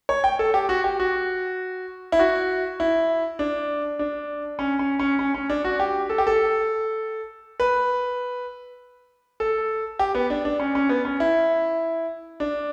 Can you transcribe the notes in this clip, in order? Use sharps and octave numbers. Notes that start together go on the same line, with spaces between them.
C#5
G5
A4
G4
F#4
G4
F#4
E4
F#4
E4
D4
D4
C#4
C#4
C#4
C#4
C#4
D4
F#4
G4
A4
G4
A4
B4
A4
G4
B3
D4
D4
C#4
C#4
B3
C#4
E4
D4